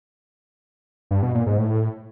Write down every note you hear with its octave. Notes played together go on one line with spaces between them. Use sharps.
G2
B2
A#2
G#2
A2